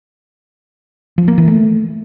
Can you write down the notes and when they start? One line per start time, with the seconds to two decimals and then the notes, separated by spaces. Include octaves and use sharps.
1.18 F3
1.28 A#3
1.38 E3
1.48 A3